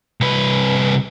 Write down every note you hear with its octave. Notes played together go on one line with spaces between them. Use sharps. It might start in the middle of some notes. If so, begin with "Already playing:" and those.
C2 B4